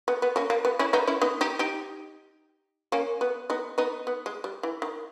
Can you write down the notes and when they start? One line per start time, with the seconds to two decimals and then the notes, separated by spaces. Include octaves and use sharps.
0.08 B3
0.22 B3
0.36 A#3 C#4
0.50 A#3
0.65 B3
0.79 C#4 E4
0.93 B3 D#4
1.07 C#4 E4
1.22 B3 D#4
1.41 D#4 G4
1.59 D#4 G4
2.92 A#3 C#4
3.21 B3
3.50 B3 D#4
3.78 B3 D#4
4.07 B3
4.26 G#3
4.44 G3
4.63 E3
4.82 D#3